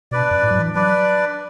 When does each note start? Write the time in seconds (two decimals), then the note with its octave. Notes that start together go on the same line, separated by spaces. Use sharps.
0.11 B2 D4 B4 D5
0.31 F#2
0.42 A2
0.50 F#3
0.59 E3
0.75 F#3 D4 B4 D5